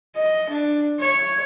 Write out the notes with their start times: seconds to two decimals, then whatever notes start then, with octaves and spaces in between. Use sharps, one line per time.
0.16 D#5
0.49 D4
1.00 C#5